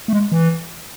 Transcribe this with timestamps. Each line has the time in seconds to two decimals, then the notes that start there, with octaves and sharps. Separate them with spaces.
0.08 A3
0.13 G#3
0.32 E3